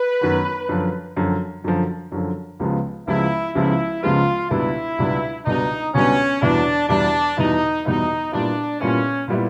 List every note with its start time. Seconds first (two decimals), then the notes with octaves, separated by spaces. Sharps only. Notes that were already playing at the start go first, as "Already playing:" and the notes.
Already playing: B4
0.21 F#2 D#3 F#3 B3
0.69 F#2 D3 F3
1.16 F#2 D3 F3
1.64 F#2 D3 F3
2.12 F#2 D3 F3
2.60 C#2 C#3 F3 G#3 B3
3.07 C#2 C#3 F3 G#3 B3 E4
3.55 C#2 C#3 F3 G#3 B3 E4
4.03 C#2 C#3 F3 G#3 B3 F4
4.50 C#2 B2 G3 B3 D4 E4
4.98 C#2 B2 G3 B3 D4
5.45 C#2 B2 G3 B3 D4 D#4
5.94 C#2 B2 G3 B3 C#4 D4
6.41 E2 B2 G3 B3 D4 E4
6.89 E2 B2 G3 B3 D4 E4
7.37 E2 B2 G3 B3 D#4 E4
7.85 E2 B2 G3 B3 D#4 E4
8.32 A#2 G3 B3 D4 E4
8.80 A#2 G3 B3 C#4 E4
9.28 A#2 G3 B3 E4